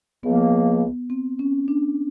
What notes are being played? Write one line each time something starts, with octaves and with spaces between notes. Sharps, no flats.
C#2 C#3 F3 A#3 B3
C4
C#4
D4